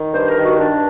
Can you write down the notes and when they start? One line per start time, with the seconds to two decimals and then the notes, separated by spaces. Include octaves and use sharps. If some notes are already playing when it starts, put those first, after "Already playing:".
Already playing: D#3
0.14 G2 C5
0.29 A#4
0.36 D#3
0.44 F#4
0.59 G2 D4